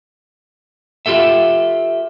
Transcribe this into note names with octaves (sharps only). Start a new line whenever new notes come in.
F4 G4 A4 E5